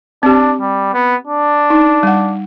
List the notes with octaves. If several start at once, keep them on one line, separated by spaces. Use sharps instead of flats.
C4 D4 G4
G3
B3
D4
D#4
G3 F#5